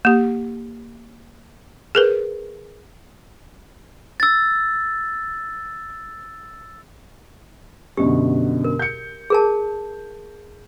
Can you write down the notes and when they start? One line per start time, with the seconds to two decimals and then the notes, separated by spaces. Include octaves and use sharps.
0.05 A#3 G4
1.95 G#4 A#4 B4
4.20 E6 A6
7.97 F#2 B2 D3 G4
8.64 A#4
8.79 G6 C#7
9.30 G#4 A#4 A5